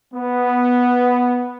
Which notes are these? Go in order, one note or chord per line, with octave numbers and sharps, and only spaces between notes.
B3